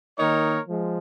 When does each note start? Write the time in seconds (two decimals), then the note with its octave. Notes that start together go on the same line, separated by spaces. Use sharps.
0.19 D#3 A#3 D#4 A#4 C#5
0.69 F3 G#3